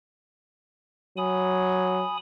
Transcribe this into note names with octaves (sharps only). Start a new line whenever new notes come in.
F#3 G#5 B5 D#6